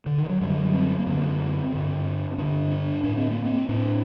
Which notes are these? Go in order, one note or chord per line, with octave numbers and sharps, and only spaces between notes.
D3
D#3
F#3
F#2 D3 G3
C4
A#3
F#2 D3 C4
G2 D3
G2 D3 D4
D4
A2 D4
C4
A#3
C4
A2 D4